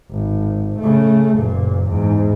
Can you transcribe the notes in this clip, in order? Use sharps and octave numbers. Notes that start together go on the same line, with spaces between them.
G#1
C#3 A3
F#1 A#2
E2 G#2